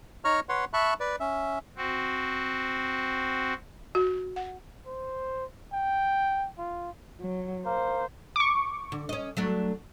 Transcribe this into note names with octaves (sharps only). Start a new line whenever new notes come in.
D#4 C#5 A#5 C#6 F6
B4 C#5 F#5 C6
E5 A5 B5 C#6 F#6
B4 D5
C#4 E5
C4 F#4
F#4
F#5
C5
G5
F4
F#3
A#3 C5
C#6 D6
D3
C#4 D#5
F#3 A3 D4